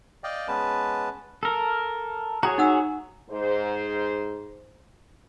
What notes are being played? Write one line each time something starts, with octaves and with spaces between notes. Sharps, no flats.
D5 D#5 F5 G5
G#3 B3 C#4 B4 A5
A4 A#4
F#4 G#4 C#5 A#5
D#4 F#5 E6
G#2 C5